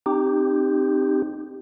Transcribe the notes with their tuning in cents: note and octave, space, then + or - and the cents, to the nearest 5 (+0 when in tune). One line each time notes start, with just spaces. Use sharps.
C4 +0 D#4 -25 G4 +0